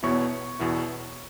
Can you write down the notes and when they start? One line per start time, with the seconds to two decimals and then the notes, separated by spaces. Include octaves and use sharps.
0.03 E2 B2 B3 E4 C#5 C#6
0.59 E2 B2 B3 E4